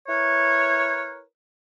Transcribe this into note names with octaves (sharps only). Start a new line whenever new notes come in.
E4 A#4 B4 C#5